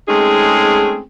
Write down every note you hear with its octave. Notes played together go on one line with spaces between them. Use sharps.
G#3 A3 C4 C#4 D#4 G#4